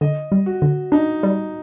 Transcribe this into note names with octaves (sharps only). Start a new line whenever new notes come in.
D3 D#5
G3
F#4
D3
D4 D#4
G3